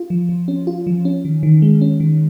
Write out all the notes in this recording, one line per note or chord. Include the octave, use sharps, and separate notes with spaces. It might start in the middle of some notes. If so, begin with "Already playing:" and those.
Already playing: F4
F3
F3
C#4
F4
F3
C#4
D#3
D#3
G#3
C#4
D#3